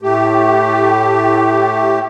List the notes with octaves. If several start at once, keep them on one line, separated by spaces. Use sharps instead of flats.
A2 A3 G4